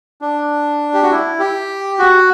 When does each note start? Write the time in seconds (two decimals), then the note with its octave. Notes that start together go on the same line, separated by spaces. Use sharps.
0.22 D4
0.94 G4
1.02 F#4
1.11 E4
1.40 G4
1.99 F#4